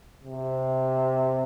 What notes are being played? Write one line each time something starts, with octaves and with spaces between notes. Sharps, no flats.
C3